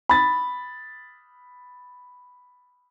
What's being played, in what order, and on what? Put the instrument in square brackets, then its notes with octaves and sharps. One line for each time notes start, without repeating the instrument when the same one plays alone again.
[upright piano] B5 A6